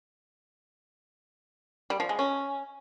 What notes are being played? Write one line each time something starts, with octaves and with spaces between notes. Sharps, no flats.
G3
F3
G#3
C#4